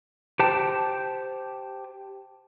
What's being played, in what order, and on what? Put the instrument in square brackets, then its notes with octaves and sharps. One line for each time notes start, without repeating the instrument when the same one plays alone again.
[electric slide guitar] G4 C5 G5 A5